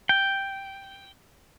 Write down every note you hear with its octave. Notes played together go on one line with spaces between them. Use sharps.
G5